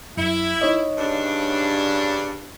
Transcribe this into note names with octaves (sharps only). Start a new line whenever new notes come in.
F#2 E4
D#4 C#5 D#5
G2 C#3 D4